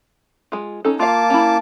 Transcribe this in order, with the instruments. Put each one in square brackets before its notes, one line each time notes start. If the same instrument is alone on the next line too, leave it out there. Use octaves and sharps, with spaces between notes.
[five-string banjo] G#3 F4
C#4 D#4 A4
[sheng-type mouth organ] A#3 A5 D6 [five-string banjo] F4 F5
[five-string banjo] C#4 E4